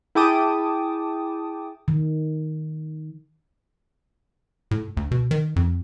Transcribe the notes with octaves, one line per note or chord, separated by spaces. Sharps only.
E4 G#4 G5 A5 D6 D#6
D#3
A2
D2
B2
D#3
F2